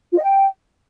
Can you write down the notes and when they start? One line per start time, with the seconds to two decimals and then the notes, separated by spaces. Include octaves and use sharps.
0.12 F4
0.17 D#5
0.22 G5